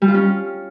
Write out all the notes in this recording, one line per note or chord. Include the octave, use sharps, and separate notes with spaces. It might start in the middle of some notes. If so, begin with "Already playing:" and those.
G3
F4
C#4